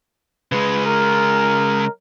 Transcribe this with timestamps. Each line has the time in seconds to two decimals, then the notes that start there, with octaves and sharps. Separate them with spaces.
0.52 C#3 G#3 B4
0.86 A#4